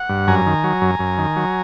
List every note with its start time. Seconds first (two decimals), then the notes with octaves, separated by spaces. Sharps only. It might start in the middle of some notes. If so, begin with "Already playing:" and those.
Already playing: F#5
0.09 G2
0.27 F#2 G#5 A#5
0.46 D#3
0.64 F#3
0.82 F#2
0.99 F#2
1.18 D#3
1.36 F#3